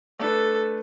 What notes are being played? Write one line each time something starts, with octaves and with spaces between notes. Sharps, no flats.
A3 D4 A4 B4